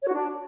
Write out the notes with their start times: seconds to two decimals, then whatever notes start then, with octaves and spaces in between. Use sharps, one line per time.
0.02 C#5
0.07 F#4
0.12 D4